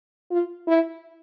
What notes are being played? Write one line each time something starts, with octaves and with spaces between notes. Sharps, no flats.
F4
E4